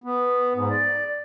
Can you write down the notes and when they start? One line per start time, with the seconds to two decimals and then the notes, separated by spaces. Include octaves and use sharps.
0.04 B3
0.55 G#2
0.70 D5